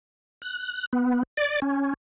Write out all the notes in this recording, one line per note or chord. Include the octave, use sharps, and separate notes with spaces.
F#6
B3
D5
C#4